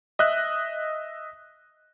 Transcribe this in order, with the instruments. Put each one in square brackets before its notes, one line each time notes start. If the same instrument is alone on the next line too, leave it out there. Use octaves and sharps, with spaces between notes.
[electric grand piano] D#5 E5 F#6